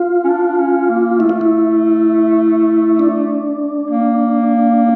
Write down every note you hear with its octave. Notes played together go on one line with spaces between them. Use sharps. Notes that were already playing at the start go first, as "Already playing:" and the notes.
Already playing: F4
C#4
D4
D4
C#4
A#3
A3 E4
F4
E4
D4
A#3